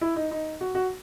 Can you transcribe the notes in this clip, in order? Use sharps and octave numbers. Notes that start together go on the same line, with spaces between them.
E4
D#4
D#4
F#4
F#4